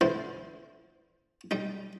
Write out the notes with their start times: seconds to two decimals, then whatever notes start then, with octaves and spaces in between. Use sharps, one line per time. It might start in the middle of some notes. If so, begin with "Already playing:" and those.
0.01 D3 E3 E4 C5
1.51 G3 D#4